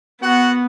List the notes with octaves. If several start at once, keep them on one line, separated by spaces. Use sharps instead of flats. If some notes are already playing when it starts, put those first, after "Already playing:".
B3 F#4 F#5